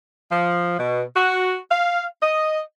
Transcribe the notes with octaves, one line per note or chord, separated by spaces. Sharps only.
F3
B2
F#4
F5
D#5